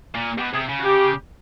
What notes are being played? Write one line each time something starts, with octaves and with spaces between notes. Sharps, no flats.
A#2
B2 G4
C3 G#4
C#3
F#4
G4